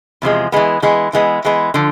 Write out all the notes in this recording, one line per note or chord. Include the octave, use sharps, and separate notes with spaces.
E2 C3 F3 G#3
E3 G#3 B3
E3 G#3 B3
E3 G#3 B3
E3 G#3 B3
D3 F3